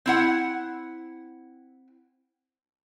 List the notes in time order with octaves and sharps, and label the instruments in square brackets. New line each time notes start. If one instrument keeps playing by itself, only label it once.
[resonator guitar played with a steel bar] C4 E4 F#5